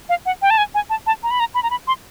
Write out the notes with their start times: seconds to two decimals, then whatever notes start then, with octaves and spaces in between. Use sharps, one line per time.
0.09 F5
0.26 F#5
0.42 G5
0.50 A5
0.58 G#5
0.75 G#5
0.90 A5
1.07 A5
1.23 A#5
1.31 B5
1.40 A#5
1.54 B5
1.63 A#5
1.70 B5
1.87 C6